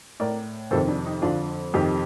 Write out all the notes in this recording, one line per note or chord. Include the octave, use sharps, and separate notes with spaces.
A2 A#4 D5
F2 C3 D#3 A4 C5
D4
D#4
F2 D3 D4 F4
F2 C3 D#3 D#4 G4